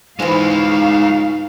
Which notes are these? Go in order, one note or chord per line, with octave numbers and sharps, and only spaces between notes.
G#2 E3 G#3 D#4 F4 F5